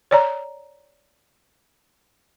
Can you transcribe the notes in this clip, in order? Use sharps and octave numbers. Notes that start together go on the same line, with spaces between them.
C#5 D5 A#5